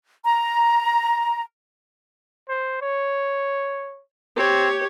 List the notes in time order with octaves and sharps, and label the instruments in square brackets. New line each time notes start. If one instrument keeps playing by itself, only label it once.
[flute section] A#5
[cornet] C5
C#5
[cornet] C4 [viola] G4 C#5